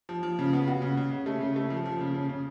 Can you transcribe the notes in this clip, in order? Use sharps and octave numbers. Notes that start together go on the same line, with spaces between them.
F3
F3
C#3
B3
F#4
C#3
C#3
C#3
A3
C#3
A3
F3
F3
C#3
C#3
C#3